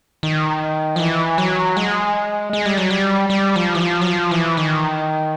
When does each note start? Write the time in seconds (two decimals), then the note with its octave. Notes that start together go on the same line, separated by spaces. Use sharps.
0.23 D#3
0.96 F3
1.00 E3
1.38 F#3
1.77 G#3
2.53 G#3
2.66 G3
2.78 F#3
2.90 G3
3.30 G3
3.56 F3
3.75 E3
3.80 F3
4.01 F#3
4.06 F3
4.31 E3
4.57 D#3